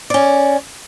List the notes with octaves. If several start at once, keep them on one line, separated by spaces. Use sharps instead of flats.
C#4 D5